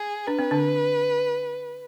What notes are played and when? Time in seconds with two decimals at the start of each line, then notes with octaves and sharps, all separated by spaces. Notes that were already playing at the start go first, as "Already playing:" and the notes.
Already playing: G#4
0.27 D4 B4
0.39 C4
0.51 D3 D4